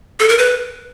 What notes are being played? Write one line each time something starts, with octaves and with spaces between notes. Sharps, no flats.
A4
A#4
B4